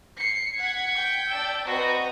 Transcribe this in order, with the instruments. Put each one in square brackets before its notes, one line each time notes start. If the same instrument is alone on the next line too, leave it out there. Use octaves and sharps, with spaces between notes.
[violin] C7 C#7
[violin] F#5 [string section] G#6 B6 C#7
[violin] G5
[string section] D5 A5 E6
[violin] C4 F#4 [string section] B4 D#5 A#5